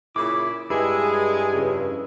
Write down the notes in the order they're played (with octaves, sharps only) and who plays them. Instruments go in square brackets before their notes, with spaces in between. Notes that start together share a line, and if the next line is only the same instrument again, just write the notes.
[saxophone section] A#2 C#3 E4 [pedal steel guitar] D6
[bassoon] G2 [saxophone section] G#3 G#4 [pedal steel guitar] E4
[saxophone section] F2 C#3